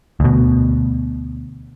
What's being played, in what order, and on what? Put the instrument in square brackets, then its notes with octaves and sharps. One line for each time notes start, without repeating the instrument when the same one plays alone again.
[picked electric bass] D2 B2